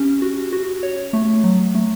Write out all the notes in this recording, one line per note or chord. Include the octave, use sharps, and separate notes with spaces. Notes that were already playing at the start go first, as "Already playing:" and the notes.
Already playing: C#4 G4
F#4
F#4
C#5
A3
F#3
A3